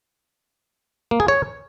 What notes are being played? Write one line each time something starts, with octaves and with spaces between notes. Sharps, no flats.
A#3
G#4
C#5